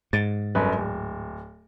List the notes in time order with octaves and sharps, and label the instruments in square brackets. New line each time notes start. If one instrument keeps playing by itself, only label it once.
[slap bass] G#2 [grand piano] A6
[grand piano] G1 F#2 B4
D1